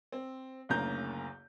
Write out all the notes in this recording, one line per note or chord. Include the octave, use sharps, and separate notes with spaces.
C4
F#1 D2 C#3 A#3 A#5 G6